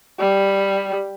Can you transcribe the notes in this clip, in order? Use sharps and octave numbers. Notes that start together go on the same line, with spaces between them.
G3